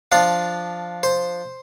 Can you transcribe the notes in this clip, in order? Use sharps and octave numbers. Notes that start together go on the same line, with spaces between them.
F3 D4 F4 F5
C5